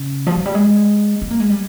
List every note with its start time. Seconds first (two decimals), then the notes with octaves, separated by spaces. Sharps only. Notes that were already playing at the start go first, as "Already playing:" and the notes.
Already playing: C#3
0.27 F3
0.36 F#3
0.46 G3
0.55 G#3
1.22 B3
1.31 A#3
1.40 G#3
1.50 G3